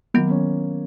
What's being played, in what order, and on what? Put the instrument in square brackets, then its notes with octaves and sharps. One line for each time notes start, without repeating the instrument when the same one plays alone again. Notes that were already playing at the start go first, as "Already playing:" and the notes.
[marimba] D#3 F#3 B3 [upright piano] A#3
[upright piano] C#4